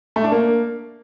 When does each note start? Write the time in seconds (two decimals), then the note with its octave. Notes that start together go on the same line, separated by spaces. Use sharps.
0.16 A3
0.24 D4
0.32 A#3